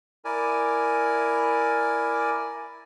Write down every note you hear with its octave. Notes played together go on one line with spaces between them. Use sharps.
E4 A#4 D5 G#5